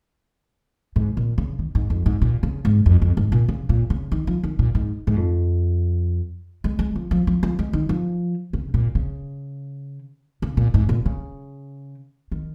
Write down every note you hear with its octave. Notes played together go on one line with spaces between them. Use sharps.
G#2
A#2
C#3
D#3
G#2
F2
G#2
A#2
C#3
G#2
F2
F2
G#2
A#2
C#3
A#2
C#3
D#3
F3
D#3
A#2
G#2
G#2
F2
G#3
G#3
F3
F3
F3
F3
G#3
D#3
F3
C#3
A#2
C#3
C#3
A#2
G#2
A#2
C#3
D#3